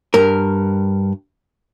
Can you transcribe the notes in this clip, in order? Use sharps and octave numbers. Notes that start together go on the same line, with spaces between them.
G2 A#4